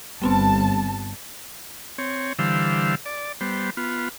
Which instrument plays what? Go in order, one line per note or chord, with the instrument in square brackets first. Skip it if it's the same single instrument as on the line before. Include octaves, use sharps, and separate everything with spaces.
[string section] G1 A5 [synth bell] G3 B3 C4
[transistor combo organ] C4 C#5
D3 E3 G3 C5 F5 E6
D5
G3 B3 C5
B3 F4